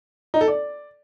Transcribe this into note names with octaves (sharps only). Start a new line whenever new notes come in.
D#4
A4
D5